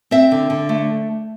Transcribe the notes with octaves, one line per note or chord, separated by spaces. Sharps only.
C4 E5
D3
D3
A3